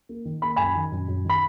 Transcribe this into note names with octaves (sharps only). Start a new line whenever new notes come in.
A#3
D#3
A#3 B5
F#2 G#5 B5
D#3
F#2
F#2
D#3 B5